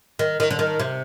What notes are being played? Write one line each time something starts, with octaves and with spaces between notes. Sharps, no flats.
D#3
D#3
D3
D#3
C3